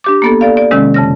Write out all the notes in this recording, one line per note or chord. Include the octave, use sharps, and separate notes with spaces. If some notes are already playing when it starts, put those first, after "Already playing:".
D4 G4 D6
A#3 B3 A4
A4 D5 F5
D5
C3 D#3 G#3 C#4
F2 C#3 A#6